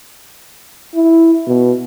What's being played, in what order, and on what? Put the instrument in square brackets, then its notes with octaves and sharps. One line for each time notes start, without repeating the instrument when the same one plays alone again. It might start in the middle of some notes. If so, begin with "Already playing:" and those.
[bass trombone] E4
B2